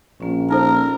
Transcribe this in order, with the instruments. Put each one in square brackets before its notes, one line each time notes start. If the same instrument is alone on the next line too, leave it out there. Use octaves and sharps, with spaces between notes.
[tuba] A#1 [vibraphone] A#3 C#4
[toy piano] D#4 A4 C5 [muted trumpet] A#4